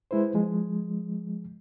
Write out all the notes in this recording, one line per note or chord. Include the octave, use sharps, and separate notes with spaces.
G#3 E4 B4 C5
F3 G#3